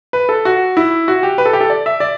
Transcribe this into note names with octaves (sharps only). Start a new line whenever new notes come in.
B4
A4
F#4
E4
F#4
G4
B4
A4
G4
A4
D5
E5
D5